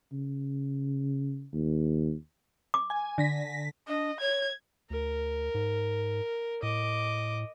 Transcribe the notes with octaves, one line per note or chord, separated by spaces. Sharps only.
C#3
D#2
D6
G#5
D3 A#6 B6
D4 D#5
C#5 G#6
D2 A#4
G#2
A2 D#5 D6